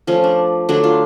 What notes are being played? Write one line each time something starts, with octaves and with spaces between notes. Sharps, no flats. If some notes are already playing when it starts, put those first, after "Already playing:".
F3 A3 C#4
D4
D3 F#3 A3 D4
F4